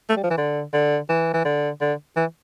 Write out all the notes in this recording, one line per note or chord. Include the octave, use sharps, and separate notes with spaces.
A3
G3
F3
E3
D3
D3
E3
E3
D3
D3
E3